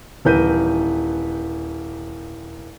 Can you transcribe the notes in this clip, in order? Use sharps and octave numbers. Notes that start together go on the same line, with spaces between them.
D#1 E3 A#4 B4 G6 D#7